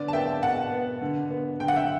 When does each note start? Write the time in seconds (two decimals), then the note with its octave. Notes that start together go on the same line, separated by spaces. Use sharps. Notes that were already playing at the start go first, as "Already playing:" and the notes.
Already playing: D3 B3 D5
0.08 A5
0.13 B3 E5 G5
0.42 B2 F#5 A5
0.72 B3
1.02 D3
1.31 B3
1.59 D3 G5
1.68 F#5
1.76 E5 G5